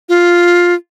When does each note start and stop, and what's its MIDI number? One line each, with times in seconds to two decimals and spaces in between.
0.09 0.74 65